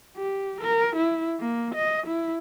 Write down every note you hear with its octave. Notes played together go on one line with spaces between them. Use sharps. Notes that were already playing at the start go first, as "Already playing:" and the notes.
G4
A#4
E4
A#3
D#5
E4